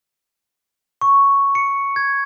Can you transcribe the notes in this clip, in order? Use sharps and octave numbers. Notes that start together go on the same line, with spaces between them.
C#6
C#7
G#6